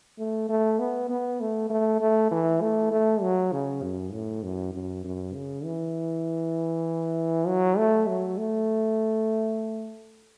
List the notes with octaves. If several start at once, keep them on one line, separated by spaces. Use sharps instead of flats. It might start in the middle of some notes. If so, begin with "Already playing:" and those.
A3
A3
B3
B3
A3
A3
A3
E3
A3
A3
F#3
C#3
F#2
A2
F#2
F#2
F#2
C#3
E3
F#3
A3
F#3
A3